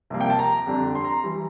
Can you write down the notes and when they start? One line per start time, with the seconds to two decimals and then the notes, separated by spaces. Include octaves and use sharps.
0.10 C2 C3 F3 A#3
0.21 G5
0.30 A5
0.39 A#5
0.67 F2 D3 G3 D4
0.95 C6
1.05 A#5
1.24 E3 G3